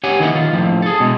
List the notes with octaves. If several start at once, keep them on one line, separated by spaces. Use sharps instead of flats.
G4 C#5 F#5 G#5
D#3 E3 A#3 B3 F#5
D#3 F4
A2 F3 A#3
G#4 A4
B2 G#3